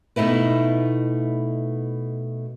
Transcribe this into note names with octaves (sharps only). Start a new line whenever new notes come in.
B2 A3 D#4 E4 B4